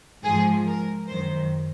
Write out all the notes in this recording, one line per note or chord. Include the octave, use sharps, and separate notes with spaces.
G#2 F3 G#4
A#4
F#2 D#3 C5